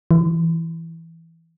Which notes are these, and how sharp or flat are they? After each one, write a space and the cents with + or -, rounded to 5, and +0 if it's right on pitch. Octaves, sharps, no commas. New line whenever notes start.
E3 +0